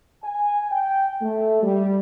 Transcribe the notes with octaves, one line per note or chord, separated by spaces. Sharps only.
G#5
G5
A3
G3